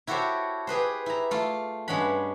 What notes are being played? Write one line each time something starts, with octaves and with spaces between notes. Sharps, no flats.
E4 F#4 G4 A4 C5 C#5
G4 G#4 B4 C5
E4 A#5
A3 F4
G2 G#3 C#4 F#5 B5